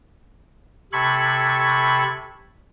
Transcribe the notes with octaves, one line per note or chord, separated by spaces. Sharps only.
C3 A4 B5 C#6 G#6